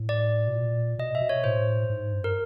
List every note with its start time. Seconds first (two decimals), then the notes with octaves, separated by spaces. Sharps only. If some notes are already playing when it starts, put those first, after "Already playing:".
Already playing: A2
0.09 D5
0.47 B2
0.54 A#2
0.99 B2 D#5
1.15 E5
1.22 B2
1.29 C#5
1.44 A2 C5
1.90 G#2
2.12 G2
2.24 A#4